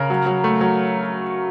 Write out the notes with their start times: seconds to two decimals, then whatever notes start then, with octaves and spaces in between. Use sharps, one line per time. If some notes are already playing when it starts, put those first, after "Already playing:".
Already playing: C#3 A#4
0.10 F#3
0.26 F#3
0.44 A3
0.61 F#3